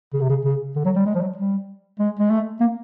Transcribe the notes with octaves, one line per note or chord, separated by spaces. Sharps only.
C#3
C3
C#3
C#3
D3
F#3
G3
G#3
F3
F#3
G3
G#3
G#3
A3
A#3